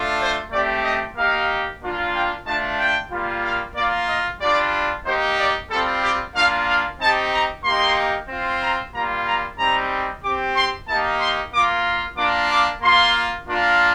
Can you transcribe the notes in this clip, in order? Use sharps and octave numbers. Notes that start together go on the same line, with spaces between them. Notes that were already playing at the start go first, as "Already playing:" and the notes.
Already playing: A3 D4 F4
C5
A3 C4 G4 D5
D#5
A#3 D#4 G4 F5
A#3 D4 F4
G5
A3 D4 F4 A5
G5
G3 A#3 F4
F5
A#3 F4 D5
D#5
G3 D4 F4 D5
A#3 D#4 G4 C5
D5
G3 C4 F4 A4
G4
A#3 D4 F4 F5
F5
C4 D#4 G4 A5
A#5
A#3 D#4 G4 C6
C4 F4
A#5
G3 A#3 F4 A#5
A#5
G3 C4 D#4 G4 A#5
C4 G4 D6
C6
A#3 D#4 G4 A5
C6
A#3 F4 D6
A#3 D4 F4 D6
D6
A#3 F4 C6
A#3 D4 F4